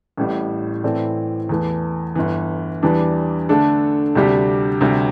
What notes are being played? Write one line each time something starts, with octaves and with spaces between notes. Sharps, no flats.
A1 A2 G3
A2 E3 C4 A4 D5
E2 E3 A3
G1 G2 E3
E2 E3 G3 D4
D3 A3 D4 A4
D2 C3 G3 D4 G4
D2 C3 G3